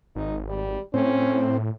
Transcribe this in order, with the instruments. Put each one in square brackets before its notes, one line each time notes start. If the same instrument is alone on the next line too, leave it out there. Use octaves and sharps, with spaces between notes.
[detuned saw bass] G#1 [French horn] D#4
[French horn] G3
[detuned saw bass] A2 [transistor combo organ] C4 [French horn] C#4